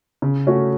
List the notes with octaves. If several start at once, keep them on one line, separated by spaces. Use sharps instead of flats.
C#3
A3 C#4 F#4